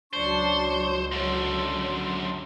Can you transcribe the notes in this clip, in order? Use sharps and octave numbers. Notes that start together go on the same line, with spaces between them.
C#2 F#3 D4 C5 A5 C#6
F#2 D3 C6